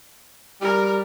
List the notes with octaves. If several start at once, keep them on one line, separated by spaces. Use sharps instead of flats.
G3 A#4